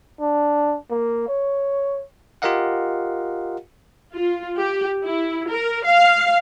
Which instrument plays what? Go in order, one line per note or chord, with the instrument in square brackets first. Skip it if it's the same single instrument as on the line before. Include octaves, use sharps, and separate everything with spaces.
[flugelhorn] D4
A#3
C#5
[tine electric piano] F4 G4 A#4 D#5 F5 F#5
[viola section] F4
G4
E4
A#4
F5